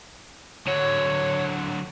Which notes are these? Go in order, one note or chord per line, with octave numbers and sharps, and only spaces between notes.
D3 F#3 C#5